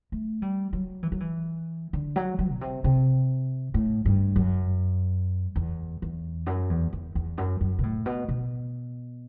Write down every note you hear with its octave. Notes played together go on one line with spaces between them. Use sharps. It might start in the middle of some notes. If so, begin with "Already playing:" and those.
A3
G3
F#3
E3
F#3
E3
D3
F#3
F#3
B2
C3
C3
A2
G2
F#2
E2
E2
F#2
E2
E2
E2
F#2
F#2
B2
A2
B2
B2